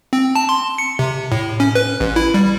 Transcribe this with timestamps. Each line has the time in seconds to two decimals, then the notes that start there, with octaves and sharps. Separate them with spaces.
0.13 C4
0.36 A5
0.49 C6
0.78 C#7
0.99 C3
1.32 A2
1.60 C#4
1.75 B4
2.00 A1
2.16 E4
2.34 G3